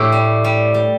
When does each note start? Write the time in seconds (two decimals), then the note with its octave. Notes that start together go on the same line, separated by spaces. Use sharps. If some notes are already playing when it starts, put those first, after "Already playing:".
Already playing: A2 E3 E4 G4
0.12 G3
0.44 G3
0.74 G3